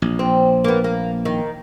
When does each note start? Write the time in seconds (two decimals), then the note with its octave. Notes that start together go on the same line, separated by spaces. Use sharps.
0.02 A#1
0.19 C4
0.64 A#3 B3
0.84 A#3
1.25 D#3